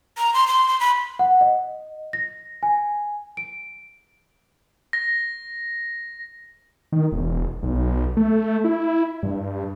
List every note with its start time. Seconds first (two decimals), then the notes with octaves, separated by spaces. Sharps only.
0.17 A#5
0.34 C6
0.47 C6
0.68 C6
0.80 B5
1.19 F#5
1.41 D#5
2.13 A#6
2.63 G#5
3.37 D7
4.93 A#6
6.92 D#3
7.12 E1
7.63 B1
8.17 A3
8.64 E4
9.23 G2